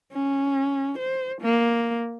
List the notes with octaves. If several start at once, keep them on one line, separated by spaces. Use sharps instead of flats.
C#4
C5
A#3